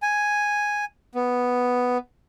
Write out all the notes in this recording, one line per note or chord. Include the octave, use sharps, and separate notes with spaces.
G#5
B3